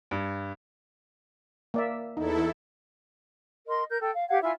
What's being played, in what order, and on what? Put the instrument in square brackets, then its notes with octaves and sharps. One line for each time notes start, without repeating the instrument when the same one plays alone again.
[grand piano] G2
[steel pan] A#3 D5 E5
[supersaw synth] E2 E4 A4 [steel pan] D#4
[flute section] A#4 D#5 C6
A#4 G6
A4 G5
F5
G4 F5 F#5 G#6
E4 F4 E5 G#5